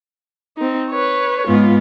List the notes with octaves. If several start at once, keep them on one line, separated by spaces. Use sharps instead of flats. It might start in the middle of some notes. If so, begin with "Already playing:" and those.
C4 D#4
B4 C#5
G#2 B3 F4